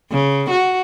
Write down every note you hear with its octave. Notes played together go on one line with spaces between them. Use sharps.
C#3
F#4